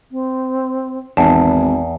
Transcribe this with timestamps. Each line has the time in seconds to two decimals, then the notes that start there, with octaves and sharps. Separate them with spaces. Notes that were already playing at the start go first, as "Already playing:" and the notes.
0.11 C4
1.17 G#1 E2 D#4 A5